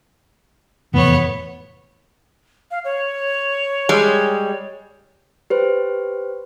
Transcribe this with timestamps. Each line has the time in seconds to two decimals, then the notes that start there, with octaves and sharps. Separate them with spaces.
0.94 F1 E2 A2 B3 C#5
2.71 F5
2.84 C#5
3.89 G3 G#3
5.50 G4 B4 C5